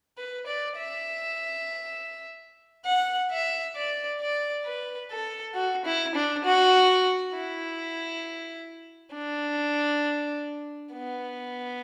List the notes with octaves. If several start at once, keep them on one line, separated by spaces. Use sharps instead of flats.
B4
D5
E5
F#5
E5
D5
D5
B4
A4
F#4
E4
D4
F#4
E4
D4
B3